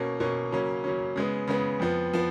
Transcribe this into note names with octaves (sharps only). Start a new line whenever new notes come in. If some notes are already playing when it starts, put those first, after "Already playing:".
Already playing: B2 A#3 C#4
B2 A#3 C#4
C#3 F#3 A#3 C#4
C#3 F#3 A#3 C#4
C#3 G#3 B3
C#3 G#3 B3
F2 F3 B3
F3 B3